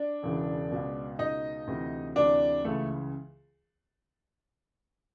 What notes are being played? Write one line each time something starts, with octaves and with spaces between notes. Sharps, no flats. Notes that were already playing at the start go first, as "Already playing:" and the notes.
Already playing: D4 D5
E1 E2 C#3 E3
C#2 B2
C#2 B2 D#4 D#5
D2 C3 E3
D2 C3 E3 D4 D5
C#2 C#3 E3 A3 A4